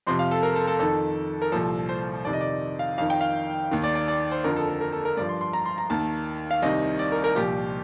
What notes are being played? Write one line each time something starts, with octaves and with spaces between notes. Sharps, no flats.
F2 C3 F3 C6
F5
A4
A#4
A4
A4
F2 D#3 A4
A#4
C2 A#2 F3 A4
C5
F2 C3 D#3 D5
D#5
D5
F5
F2 D#3 F5
G5
F5
D#2 D#3
D5
D5
D5
C5
F2 D3 F3 A#4
A4
A4
A#4
A4
A#4
G2 F3 D5
C6
C6
A#5
C6
A#5
D#2 D#3 A5
F5
C2 C3 D#3 D#5
D5
A#4
A#4
C2 A#2 F3 G4